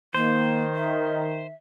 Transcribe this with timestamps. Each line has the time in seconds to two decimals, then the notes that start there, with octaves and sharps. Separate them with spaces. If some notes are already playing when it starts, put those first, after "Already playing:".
0.15 D#3 A#3 C5
0.75 E5